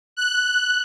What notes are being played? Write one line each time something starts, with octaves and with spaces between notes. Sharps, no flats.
F#6